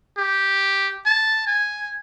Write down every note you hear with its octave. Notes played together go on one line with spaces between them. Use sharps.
G4
A5
G#5